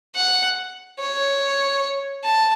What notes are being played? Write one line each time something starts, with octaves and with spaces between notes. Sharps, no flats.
F#5
C#5
A5